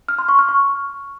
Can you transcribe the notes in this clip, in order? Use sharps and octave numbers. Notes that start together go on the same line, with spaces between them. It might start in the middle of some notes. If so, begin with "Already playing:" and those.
F6
C6
C#6
F6
C#6